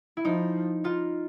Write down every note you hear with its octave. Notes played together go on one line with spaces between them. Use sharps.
E4
F3 D#4
D#4 F4